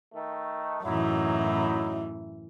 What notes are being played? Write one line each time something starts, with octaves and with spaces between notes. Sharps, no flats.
D#3 A3
F#2 A2 E3 F#3 D#4 E4